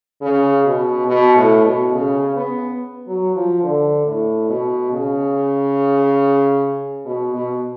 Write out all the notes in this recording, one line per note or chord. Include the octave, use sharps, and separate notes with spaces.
C#3
B2
B2
A2
B2
C#3
B3
F#3
F3
D3
A2
B2
C#3
B2
B2